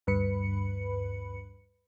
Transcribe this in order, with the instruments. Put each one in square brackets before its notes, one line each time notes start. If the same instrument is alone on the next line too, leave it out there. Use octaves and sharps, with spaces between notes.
[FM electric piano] D2 G2 B4 B5 C#7